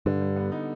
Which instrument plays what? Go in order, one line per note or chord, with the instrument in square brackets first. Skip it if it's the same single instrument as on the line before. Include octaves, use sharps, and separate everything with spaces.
[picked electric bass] G2 [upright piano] D3
[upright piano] G3
B3
D#4